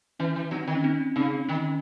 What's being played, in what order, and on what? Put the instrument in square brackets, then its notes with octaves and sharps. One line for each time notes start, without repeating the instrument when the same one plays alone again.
[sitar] E3 [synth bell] C#4
[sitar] E3
[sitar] F#3 [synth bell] C4 D#4
[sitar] D#3
[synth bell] C#4
C4 D#4
[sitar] C#3 [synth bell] C4 D#4
[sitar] D#3 [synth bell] C#4